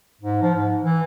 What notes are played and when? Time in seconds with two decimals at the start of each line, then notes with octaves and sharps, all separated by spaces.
0.21 G#2
0.42 F3
0.55 G#2
0.80 E3